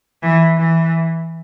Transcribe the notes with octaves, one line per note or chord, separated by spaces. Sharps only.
E3
E3